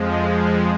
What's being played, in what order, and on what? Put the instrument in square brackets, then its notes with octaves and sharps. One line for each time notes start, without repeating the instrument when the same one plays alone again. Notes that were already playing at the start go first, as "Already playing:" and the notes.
Already playing: [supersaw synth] F2 F3 G#3